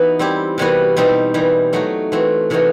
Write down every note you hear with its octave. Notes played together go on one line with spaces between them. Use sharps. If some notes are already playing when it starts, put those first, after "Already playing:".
Already playing: E3 B3 D#4 F#4
G3 C4 E4 G4
C3 E3 G3 B3 F#4
B2 G3 C4 D#4 G4
E3 G3 D#4
F#3 A3 D#4 F#4
E3 A3 C4 F#4
C3 E3 A3 D#4 F#4